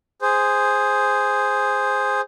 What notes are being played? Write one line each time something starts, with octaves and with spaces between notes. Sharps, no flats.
G#4 C5